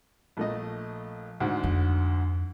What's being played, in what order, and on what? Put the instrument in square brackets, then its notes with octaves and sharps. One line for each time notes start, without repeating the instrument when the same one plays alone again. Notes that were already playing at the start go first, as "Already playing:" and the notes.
[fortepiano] A#1 A3 D#5
D2 G#2
[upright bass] F2